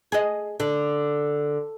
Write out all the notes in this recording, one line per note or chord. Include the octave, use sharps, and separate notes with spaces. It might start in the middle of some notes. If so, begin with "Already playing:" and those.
G#4 D#5
D3